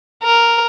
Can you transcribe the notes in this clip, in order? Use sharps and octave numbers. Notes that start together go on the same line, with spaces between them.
A#4